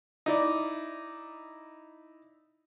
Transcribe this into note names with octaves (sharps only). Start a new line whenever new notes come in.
D#4 E4 D5